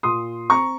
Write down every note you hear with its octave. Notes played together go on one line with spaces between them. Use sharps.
A#2 C6 D#6
C4 A#5 C#6